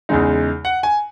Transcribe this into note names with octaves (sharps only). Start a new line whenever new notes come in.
E2 C#3 G#3 D#4
F#5
G#5